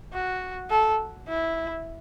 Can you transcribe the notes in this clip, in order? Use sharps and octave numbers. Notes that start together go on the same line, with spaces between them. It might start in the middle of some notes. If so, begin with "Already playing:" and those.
F#4
A4
E4